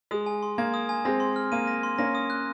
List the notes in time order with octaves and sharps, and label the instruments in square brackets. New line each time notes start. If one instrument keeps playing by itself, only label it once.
[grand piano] G#3 [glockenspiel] D#6
[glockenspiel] G#5
C6
[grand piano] A#3 [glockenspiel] G#6
[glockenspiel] D#6
G#5
[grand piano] G#3 C4 [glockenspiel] A#6
[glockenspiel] C6
F6
[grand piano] A#3 [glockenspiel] D#7
[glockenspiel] A#6
C6
[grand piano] A#3 C#4 [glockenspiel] A#6
[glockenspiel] D#6
F#6